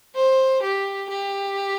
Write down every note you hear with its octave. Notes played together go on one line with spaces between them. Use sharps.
C5
G4
G4